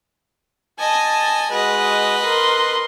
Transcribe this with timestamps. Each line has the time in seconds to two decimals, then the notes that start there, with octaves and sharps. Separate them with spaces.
0.79 D#5 G#5 A5
1.52 G#3 F#4 B4 D#5
2.26 A#4 C6